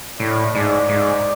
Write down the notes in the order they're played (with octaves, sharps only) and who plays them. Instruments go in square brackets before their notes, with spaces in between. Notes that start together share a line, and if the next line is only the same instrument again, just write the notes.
[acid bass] A2 [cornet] D5
[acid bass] G#2 [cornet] D5
[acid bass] G#2